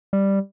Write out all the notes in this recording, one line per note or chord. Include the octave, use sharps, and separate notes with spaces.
G3